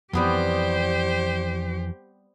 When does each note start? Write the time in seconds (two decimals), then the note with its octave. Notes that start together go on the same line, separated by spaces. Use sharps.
0.13 F2 E3 G3 B3 C4 G4 C5